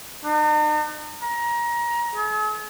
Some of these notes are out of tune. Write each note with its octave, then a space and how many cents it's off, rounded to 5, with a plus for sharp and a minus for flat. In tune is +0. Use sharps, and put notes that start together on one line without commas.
D#4 -45
A#5 +25
G#4 +45